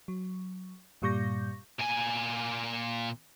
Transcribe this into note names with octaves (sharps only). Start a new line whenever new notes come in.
F#3
G2 A#2 G3 C#6 G6 A#6
A#2 G#5